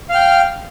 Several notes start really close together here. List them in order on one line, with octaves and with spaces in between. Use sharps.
F5 F6 G5